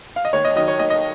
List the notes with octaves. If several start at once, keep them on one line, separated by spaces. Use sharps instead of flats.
F5
D#5
D#2 C#5
D#5
D#3 F#3 D#5
C#5
D#2 D#5
D#5